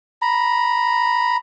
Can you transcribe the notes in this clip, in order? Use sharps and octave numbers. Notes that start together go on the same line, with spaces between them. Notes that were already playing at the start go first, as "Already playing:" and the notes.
A#5 B5